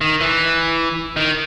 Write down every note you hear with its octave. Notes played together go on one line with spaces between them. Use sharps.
D#3
E3
D#3